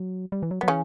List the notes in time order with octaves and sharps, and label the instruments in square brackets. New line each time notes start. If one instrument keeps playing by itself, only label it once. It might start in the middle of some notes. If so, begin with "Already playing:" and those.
Already playing: [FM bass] F#3
G3
E3
F#3
[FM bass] F#3 [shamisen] B3
[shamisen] C#3 C#4 [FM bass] E3